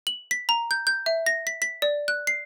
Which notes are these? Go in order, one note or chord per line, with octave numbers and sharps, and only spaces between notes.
F#7
B6
A#5
G6
G6
E5
A#6
B6
B6
D5
F#6
C7